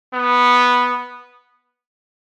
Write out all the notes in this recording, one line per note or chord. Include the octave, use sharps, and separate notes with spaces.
B3